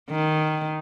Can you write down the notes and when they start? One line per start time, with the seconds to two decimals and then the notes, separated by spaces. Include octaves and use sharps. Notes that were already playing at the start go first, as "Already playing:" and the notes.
0.10 D#3